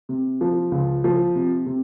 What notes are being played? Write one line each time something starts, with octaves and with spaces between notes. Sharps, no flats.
C3
F3
C#2
F3
C3
C3